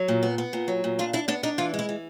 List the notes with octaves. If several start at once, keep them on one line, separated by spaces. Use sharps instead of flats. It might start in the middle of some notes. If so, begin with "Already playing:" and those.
Already playing: F#3
A#2
B3
B3
A#2
F#3
A#2
D4 F4
D4 E4
B3 D4
D4 D#4
E3 F4
G#3
E4
E3